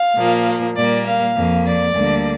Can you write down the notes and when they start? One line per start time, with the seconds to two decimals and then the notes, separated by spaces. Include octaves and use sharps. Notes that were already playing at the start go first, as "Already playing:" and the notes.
Already playing: F5
0.16 A#2 F3 A#3
0.76 A#2 G3 A#3 D5
1.06 F5
1.35 F2 F3 A#3
1.65 D5
1.95 D2 D3 G3 A#3